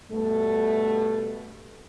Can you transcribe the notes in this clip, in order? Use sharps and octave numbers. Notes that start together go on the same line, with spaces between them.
G2 B2 A3